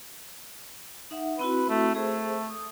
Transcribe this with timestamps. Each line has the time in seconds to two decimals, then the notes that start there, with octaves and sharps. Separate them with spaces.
1.11 D#4 E5 F#5
1.39 C4 E4 F#4 B4
1.70 A3
1.95 A3 G#4 C5
2.49 D#6